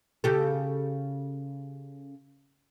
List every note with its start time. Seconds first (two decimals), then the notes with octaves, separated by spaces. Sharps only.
0.24 C#3 G4 A4